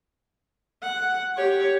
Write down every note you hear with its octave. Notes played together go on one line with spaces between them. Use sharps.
F#5
G4 C#5